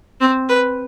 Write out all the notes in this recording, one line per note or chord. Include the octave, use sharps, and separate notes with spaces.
C4
B4